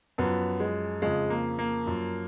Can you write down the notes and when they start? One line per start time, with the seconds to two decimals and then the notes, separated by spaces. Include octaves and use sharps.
0.18 F#2 F3 B3
0.60 G#3
1.02 F2 C#3 F3 G#3
1.30 A#3
1.59 A#3
1.86 F#2 F3